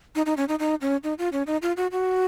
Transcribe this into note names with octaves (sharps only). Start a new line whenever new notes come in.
D#4
D#4
C#4
D#4
D#4
C#4
D#4
F4
C#4
D#4
F4
F#4
F#4